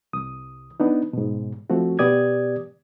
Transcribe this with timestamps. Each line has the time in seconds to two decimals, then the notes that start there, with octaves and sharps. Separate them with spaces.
0.13 C2 D#6
0.80 B3 D4 D#4
1.13 G#2 B2
1.70 F3 A3 C4 F#4
1.99 B2 B3 G4 D5 D#6 G#6